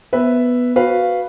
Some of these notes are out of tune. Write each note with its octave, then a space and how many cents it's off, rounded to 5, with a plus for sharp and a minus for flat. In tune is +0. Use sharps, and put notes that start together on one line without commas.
B3 +0 B4 +0 E5 +0
F#4 +0 B4 +0 F5 -5